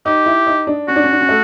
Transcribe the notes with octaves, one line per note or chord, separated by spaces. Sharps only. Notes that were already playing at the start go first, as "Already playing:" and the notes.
D#4 G4
E4
D#4
D4
C#4 F#4
D4
C#4
D4
C#4
A3